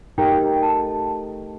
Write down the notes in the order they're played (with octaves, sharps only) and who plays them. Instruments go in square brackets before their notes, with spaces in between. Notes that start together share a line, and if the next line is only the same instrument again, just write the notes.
[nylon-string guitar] A3 D#4 G4 A#4 [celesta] G5
[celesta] A5